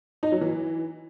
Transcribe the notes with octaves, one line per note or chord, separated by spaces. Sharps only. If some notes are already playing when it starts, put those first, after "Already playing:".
D#4
F#3
E3